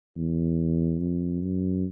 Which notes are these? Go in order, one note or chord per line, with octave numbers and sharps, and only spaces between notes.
E2
F2
F#2